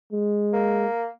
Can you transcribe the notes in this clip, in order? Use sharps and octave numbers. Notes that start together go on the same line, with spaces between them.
G#3
A#3